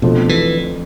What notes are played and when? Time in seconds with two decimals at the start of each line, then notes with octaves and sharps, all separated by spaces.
0.02 F2 B2 D3 F3 A3
0.29 E3